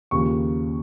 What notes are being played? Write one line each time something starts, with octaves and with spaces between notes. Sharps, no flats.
D#2 C#3 F3 A#3 C#6